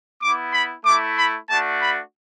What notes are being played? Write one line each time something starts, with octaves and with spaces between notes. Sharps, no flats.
B3 E4 D6
B5
A3 E4 D6
B5
A3 D4 F#4 A5
B5